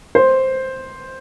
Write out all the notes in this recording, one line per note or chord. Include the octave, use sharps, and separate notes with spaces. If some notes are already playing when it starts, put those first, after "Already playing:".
C5